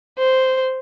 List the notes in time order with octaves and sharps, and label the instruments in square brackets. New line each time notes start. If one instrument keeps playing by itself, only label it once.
[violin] C5